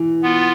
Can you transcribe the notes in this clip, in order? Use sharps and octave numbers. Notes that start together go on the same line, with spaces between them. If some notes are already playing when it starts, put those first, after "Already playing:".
Already playing: E3
B3 F4